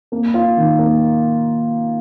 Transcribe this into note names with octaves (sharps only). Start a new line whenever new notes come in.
A#3
F4
D#3
A#3